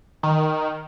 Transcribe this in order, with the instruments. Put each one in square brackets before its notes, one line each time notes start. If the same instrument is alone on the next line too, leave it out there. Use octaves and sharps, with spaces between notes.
[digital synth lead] D#3